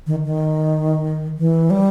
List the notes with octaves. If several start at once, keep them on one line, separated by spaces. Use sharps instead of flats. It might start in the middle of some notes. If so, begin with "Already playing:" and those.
D#3
D#3
E3
G3